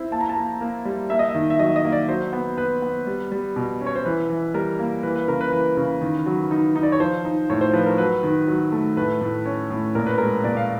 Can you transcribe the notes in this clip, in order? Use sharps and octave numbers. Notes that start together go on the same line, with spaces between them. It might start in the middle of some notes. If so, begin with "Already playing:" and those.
Already playing: C4 E4
A#3 A5
A#5
A5
A#3
A#3
G3
A#3 E5
D#5
E5
D#3
E5
F#3 D#5
D#5
A#3
D5
F#3 C5
B3
B3 B4
B3
G3
G3
B2
C#4
C#5
C5
E3 B4
E3
G3 A#4
A#3
E3 B4
B4
C#3 A#4
B4
E3 B4
C#3
D#3
F#3
D#4
D#4
D5
C#5
F3 C5
D#4
A2 C#5
C5
F3 B4
A#4
F#3 B4
D#3
F#3
A3
A2 B4
A2
C#4
A2
A#2 A#4
B4
G#3 A#4
A#2 D5
F5